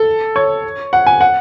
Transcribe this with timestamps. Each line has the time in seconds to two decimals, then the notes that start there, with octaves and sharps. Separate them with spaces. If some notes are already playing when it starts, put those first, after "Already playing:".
Already playing: A4
0.36 C#5
0.93 F#5
1.07 G#5
1.21 F#5